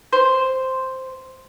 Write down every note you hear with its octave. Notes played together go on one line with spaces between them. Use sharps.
C5